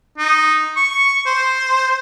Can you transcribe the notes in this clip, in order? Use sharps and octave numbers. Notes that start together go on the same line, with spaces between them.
D#4
C#6
C5